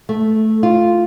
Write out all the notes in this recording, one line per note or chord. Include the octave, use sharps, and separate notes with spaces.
A3
F4